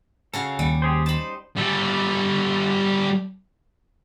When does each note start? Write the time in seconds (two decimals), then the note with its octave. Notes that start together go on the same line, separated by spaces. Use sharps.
0.33 C#3 F#4 A4 F5
0.59 D#2 G3
0.82 G4 G#4 C5
1.06 D#4 C5 A5 B5
1.57 G3 A4